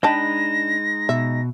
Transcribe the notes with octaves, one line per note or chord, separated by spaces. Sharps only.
G#3 D4 D#4 D#5 G5 A5 B5 A#6
B2 E5